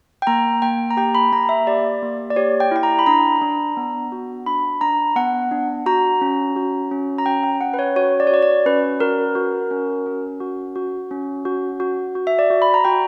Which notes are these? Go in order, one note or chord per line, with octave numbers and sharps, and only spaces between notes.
G5
A#3 A#5
A#3 G5
A#5
G4 G5
B5
A#3 A#5
E5
G4 D5
A#3
D5
G4 C#5
G5
E4 G5
A#5
B5
D4 A#5
D4
B3
F#4
D4 B5
D4 A#5
B3 F#5
D4
F#4 A#5
C#4
F#4
C#4
A#5
C#4 G5
G5
C#4 F#5
B4
C#5
F#4 C#5
D5
C#5
F#4 D5
D5
C#4 B4
F#4 A#4
F#4
C#4
C#4
F#4
F#4
C#4
F#4
F#4
F#4
E5
D5
F#4
B5
A#5
F#4 G5